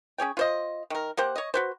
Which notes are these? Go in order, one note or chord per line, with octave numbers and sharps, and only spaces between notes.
C#4 G#4 C#5 G5
F4 C5 D#5
D#3 A#4
A#3 G4 C5 F#5
C#5 D#5
F#4 B4 C5